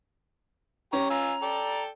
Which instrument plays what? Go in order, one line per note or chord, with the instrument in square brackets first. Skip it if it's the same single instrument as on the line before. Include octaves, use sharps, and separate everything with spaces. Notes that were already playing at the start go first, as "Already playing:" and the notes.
[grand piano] C#4 [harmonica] G4 A#5 C#6
[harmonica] F4 G#5 E6 [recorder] A#5
[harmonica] A4 D5 G5